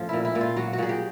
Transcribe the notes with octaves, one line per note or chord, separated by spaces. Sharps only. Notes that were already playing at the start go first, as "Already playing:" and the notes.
Already playing: A2 F3 C#4
A#2 E4
E4
A#2
F4
F#3 F#4
F#4
A#2 G#4
G4